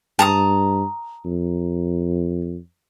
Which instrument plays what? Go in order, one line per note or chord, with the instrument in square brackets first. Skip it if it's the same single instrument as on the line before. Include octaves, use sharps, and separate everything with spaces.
[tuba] G2 [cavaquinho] A5 A#5 D#6
[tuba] F2